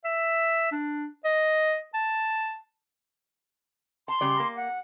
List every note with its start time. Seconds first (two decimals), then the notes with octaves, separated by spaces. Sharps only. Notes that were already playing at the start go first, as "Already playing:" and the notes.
0.05 E5
0.72 D4
1.25 D#5
1.94 A5
4.08 A5 C6
4.21 C#3 G3 D5
4.40 A#3
4.56 F#5